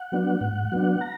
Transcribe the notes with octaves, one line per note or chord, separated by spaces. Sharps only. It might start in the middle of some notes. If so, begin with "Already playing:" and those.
Already playing: F#5
F#3 B3 D4
G#2
F#3 B3 D4
A#5